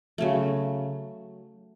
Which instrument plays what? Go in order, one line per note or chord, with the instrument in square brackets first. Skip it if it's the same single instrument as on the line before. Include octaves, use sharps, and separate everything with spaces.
[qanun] C#3 F#3 A3